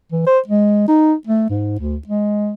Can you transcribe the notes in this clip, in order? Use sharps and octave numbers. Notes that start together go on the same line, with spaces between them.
E3
C5
G#3
D#4
A3
G#2
D2
G#3